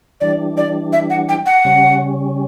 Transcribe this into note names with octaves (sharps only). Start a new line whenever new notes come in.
E3 G3 D4 D5
D5
E5
F#5
G5
F#5
C#3 G3 C#4